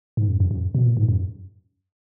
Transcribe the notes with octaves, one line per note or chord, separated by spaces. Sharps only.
G#2
F#2
F#2
F#2
B2
A#2
G#2
F#2